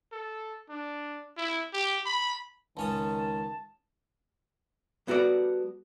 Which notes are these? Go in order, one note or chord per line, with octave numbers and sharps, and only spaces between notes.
A4
D4
E4
G4
B5
C#2 D#3 C#4 A5 D#6
G3 B3 F#4 A4 D5